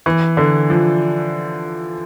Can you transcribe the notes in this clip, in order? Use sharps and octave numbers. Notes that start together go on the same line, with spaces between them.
E3
D3
F3